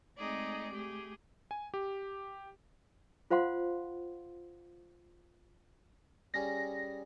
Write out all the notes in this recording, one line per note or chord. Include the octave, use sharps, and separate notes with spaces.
G#3 A3 C4 D#4 G#4 D5
A3 G4 G#4
G#5
G4
F4 C5 F5 F#5 C6
G3 C#4 G#4 A#6